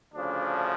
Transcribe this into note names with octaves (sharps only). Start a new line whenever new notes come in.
D2 C#3 F3 D4